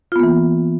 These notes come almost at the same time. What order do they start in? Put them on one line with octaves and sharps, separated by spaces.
F4 B3 A#3 E3